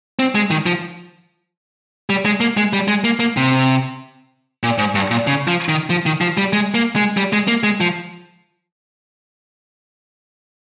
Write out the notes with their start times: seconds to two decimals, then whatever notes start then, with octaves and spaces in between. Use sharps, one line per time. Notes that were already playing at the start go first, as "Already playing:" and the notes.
0.19 C4
0.35 G#3
0.51 D#3
0.66 F3
2.10 G3
2.25 G#3
2.41 A#3
2.57 G#3
2.73 G3
2.88 G#3
3.04 A#3
3.20 A#3
3.37 C3
4.63 A#2
4.78 G#2
4.95 G2
5.11 A#2
5.27 C#3
5.48 F3
5.69 D#3
5.90 F3
6.06 D#3
6.21 F3
6.37 G3
6.53 G#3
6.74 A#3
6.96 G#3
7.17 G3
7.33 G#3
7.48 A#3
7.63 G#3
7.81 F3